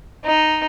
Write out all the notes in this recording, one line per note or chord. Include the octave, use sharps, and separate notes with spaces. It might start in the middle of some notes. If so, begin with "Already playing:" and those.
D#4